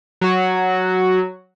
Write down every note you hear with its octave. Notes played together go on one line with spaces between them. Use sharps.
F#3 F#4